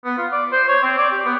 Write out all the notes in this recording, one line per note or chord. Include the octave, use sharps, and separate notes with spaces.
B3
F4
D5
C5
C#5
C4
D5
G4
B3